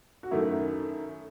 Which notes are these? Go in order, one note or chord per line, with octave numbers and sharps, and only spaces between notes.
F#4
F#2 D#3 A3 E4